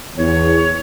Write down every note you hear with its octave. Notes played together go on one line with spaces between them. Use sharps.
E2 C#5